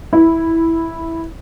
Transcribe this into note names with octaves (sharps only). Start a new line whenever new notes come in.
E4